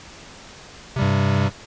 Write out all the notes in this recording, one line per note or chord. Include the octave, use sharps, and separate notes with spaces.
G2 C3 G3